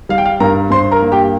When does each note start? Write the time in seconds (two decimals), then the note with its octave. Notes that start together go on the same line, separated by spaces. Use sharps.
0.09 G3 F5
0.18 G5
0.26 F5
0.40 G2 A#4 A#5
0.71 G2 C5 C6
0.91 A#4 A#5
1.02 A#3
1.12 G4 G5